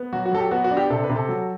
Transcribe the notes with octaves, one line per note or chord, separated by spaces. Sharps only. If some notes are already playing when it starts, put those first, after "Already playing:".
Already playing: B3
F#3 F#4
F#4
F#3 A4
G4
B3 F#4
F#4
D4
G4
C3 A4
B4
C3
A4
F#3